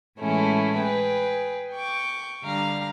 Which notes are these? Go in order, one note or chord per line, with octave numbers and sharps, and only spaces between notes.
A2 E3 G#3 A3 C#4 E4
G#4 B4 G5
G5 C#6 D6
D3 G3 F5 A#5